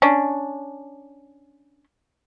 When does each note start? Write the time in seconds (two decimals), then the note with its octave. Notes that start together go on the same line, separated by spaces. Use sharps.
0.02 C#4 D4